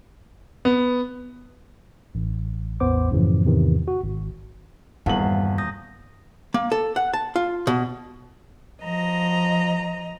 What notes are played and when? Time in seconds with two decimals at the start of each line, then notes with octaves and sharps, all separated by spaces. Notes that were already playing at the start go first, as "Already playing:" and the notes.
0.65 B3
2.15 A1
2.80 A1 E2 B3 C5 D6
3.11 F#2 A2 C#3 E3 F3
3.45 E2 G#2 C3 D#3 E3
3.88 F#4
4.04 G#1
5.06 D#1 E2 G2 F5 F#5 A5 F#7
5.58 D#6 G6 A#6
6.54 A#3
6.72 A4
6.96 F#5
7.13 A5
7.36 F4
7.67 B2
8.83 F3 D#5 A#5